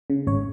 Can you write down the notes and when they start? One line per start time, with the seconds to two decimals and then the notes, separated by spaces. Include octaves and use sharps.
0.10 C#3
0.27 G#1 C#5